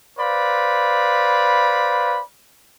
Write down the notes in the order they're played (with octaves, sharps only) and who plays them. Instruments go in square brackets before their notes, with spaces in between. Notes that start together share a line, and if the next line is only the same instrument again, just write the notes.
[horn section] B4 C5 D5 F5 B5